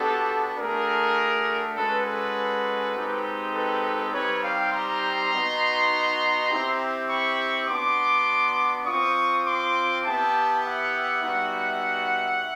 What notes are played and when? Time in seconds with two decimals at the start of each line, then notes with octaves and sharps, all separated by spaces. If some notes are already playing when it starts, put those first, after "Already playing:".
Already playing: B3 D4 F#4 G4 A4
0.58 A3 D4 F#4 G#4 A#4
1.77 G#3 C#4 F#4 A4 B4
2.06 A4 B4
2.95 G#3 C4 D#4 G4
3.55 A4 B4
4.13 G3 C4 D#4 G4 B4 C#5
4.43 F5 G5
4.73 A#5 C6
5.32 B3 D#4 F#4
6.50 C4 E4 G4
7.10 B5 C#6
7.68 B3 D4 F#4 C6 D6
8.86 C4 F4 C#6 D#6
9.46 C6 D6
10.05 B3 E4 G4 G5 A5
10.64 E5 F#5
11.23 G3 B3 D#4 F#4